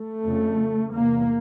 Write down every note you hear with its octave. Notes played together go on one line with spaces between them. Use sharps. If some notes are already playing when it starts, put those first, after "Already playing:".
Already playing: A3
F2 C#3
E2 C3 A#3